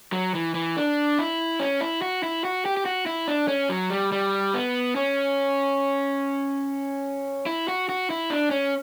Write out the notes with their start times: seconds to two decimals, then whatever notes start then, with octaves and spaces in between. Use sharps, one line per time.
0.13 F#3
0.35 E3
0.55 E3
0.77 D4
1.19 E4
1.59 C#4
1.81 E4
2.02 F#4
2.23 E4
2.44 F#4
2.65 G4
2.77 G4
2.86 F#4
3.06 E4
3.28 D4
3.48 C#4
3.69 F#3
3.90 G3
4.12 G3
4.54 B3
4.96 C#4
7.46 E4
7.68 F#4
7.89 F#4
8.10 E4
8.30 D4
8.51 C#4